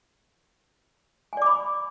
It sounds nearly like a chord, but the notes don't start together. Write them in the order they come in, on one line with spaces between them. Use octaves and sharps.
G#5 D5 D6 B5